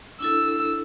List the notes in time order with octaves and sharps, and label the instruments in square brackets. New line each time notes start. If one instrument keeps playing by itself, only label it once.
[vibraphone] D4 E4 A4 [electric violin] E6